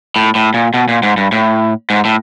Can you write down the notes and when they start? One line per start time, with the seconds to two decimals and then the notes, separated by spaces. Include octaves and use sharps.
0.16 A2
0.35 A2
0.54 A#2
0.74 B2
0.88 A#2
1.03 G#2
1.17 G2
1.32 A2
1.90 G#2
2.05 A2